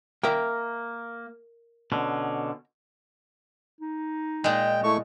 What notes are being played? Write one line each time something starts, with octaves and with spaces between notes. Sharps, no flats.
A#3 A#4 E5 G5
B2 D3 C#4
D#4
A#2 G#3 G5
A3 E4 C#6